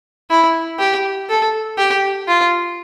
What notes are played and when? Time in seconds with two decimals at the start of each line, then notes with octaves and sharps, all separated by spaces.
0.30 E4
0.80 G4
1.29 A4
1.78 G4
2.28 F4